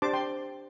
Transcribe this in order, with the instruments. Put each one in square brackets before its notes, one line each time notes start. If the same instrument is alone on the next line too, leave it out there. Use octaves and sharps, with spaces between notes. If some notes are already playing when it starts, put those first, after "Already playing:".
[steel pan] D4 G4 C5 A5 D6
G5 C6